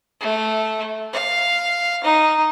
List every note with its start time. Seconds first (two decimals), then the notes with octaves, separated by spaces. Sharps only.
0.21 A3
1.13 F5
2.04 D#4